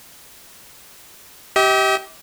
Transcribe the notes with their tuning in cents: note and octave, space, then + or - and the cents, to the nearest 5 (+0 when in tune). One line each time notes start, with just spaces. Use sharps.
G4 -15 D#5 +45